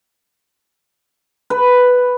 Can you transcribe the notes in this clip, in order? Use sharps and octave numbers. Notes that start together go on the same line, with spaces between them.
B4